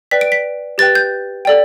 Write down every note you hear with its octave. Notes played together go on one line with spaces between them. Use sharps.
B4 D5 G5 B6
D7
B6
G4 B4 G5 A6
G6
A4 D5 G5